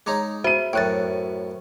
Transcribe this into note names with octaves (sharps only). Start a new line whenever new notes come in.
G#3 D#4 C#5 A#5 D6
F#4 C5 E5 D#7
F#2 A2 G5 F#6 A6